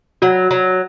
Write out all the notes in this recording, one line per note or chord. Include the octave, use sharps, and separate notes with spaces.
F#3 F#4
F#3